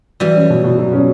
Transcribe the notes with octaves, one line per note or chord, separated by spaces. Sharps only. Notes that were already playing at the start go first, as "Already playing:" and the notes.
E3 F#3 G3
C#4
B2
B2
F#3
C#4